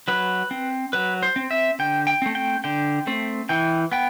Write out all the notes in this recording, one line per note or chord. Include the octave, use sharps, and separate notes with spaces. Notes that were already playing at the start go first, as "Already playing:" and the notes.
F#3 B4
C4
F#3 B4
C5
C4
E5
D3 G5
G5
A3 C4
G5
D3 G5
A3 C4
E3 G5
B3 G5